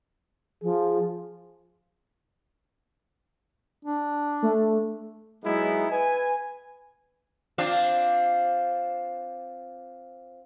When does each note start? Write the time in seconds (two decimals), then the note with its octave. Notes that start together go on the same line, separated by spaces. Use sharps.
0.62 F3 G#4
3.85 D4
4.43 A3
5.45 F#3 G#3 B3 D#4 E4
5.91 B4 G#5
7.58 C4 D4 F4